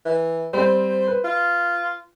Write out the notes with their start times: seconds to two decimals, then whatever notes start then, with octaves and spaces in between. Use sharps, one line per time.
0.05 E3
0.53 G3 C4 C5
1.08 B4
1.24 F4